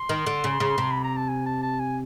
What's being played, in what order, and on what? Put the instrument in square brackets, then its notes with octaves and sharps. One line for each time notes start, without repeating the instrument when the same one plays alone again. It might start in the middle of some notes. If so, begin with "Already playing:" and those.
Already playing: [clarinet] C6
[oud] D#3
D3
C#3
C#3
C3
[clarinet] B5
A#5
A5
G#5
A5
A5
G#5